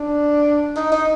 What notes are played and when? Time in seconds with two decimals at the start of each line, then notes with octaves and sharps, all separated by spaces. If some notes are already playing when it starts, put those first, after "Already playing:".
Already playing: D4
0.77 D#4
0.92 D#4